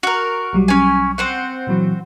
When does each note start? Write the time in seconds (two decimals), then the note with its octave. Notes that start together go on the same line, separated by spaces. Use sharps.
0.03 F#4 A#4
0.53 B1 F#3 G3
0.68 C#4 G#5
1.18 C4 C5 F#5
1.67 A#2 E3 F#3